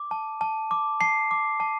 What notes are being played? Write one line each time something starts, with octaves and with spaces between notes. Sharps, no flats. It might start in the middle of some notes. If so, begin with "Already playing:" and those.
Already playing: D6
A5
A5
D6
A5 C7
D6
A5